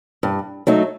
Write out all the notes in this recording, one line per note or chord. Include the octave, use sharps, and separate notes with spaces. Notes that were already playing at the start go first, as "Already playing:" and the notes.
G2
F#3 A3 D#4